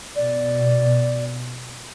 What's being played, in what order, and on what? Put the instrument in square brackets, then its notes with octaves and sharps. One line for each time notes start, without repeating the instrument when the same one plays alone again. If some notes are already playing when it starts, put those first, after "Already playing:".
[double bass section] B2 [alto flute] D5